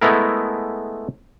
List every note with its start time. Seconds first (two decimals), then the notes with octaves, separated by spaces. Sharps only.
0.01 G#3 A3 B3 E4 G#4 A#4